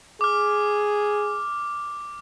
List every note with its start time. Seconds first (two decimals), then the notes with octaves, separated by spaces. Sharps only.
0.21 G#4 D6 F6